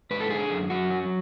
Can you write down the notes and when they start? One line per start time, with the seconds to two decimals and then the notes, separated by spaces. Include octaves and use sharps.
0.11 G#2 B4
0.20 A4
0.30 D3 G#4
0.50 F#2
0.70 F#2 F#4
0.91 F#3